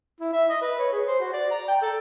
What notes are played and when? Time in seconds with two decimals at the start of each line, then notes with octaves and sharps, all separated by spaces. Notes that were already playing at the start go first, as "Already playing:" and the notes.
0.20 E4
0.33 E5
0.49 D#5
0.62 B4
0.79 C#5
0.92 G#4
1.07 C5
1.20 F#4
1.33 D5
1.51 A#5
1.68 G5
1.82 A4